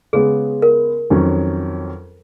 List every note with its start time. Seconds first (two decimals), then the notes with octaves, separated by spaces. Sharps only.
0.13 C#3 G#3 B3 G#4
0.62 A#4
1.10 F2 D#3 F#3 C#4